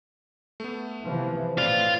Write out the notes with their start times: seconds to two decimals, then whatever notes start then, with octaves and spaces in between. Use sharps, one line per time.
0.60 A3 B3
1.03 C3 E3 F3
1.58 A2 C4 F4 B4 D5 F5